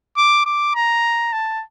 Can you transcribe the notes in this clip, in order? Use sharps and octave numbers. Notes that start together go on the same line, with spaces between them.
D6
D6
A#5
A5